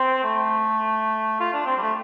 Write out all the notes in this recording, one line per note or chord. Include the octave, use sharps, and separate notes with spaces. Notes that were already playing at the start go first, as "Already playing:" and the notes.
Already playing: C4
A3
F4
D4
C4
G3
A3